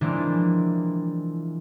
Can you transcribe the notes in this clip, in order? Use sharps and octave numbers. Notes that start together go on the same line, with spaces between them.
E3 F3 G#3 A#3 C4 D4